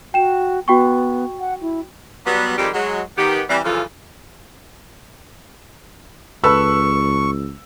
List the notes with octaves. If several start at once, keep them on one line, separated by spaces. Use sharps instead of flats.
F#4 G5 E7
B3 F#4 G5 C#6
F#5
E4
F#3 G3 B3
F2 D#3 G3 G#3 C4 G4
F#3 G#3
D#3 B3 G4
E3 G3 C4
F#2 C#3 E3 F3 F4 A4
C#2 A4 B4 B5 C#6 E6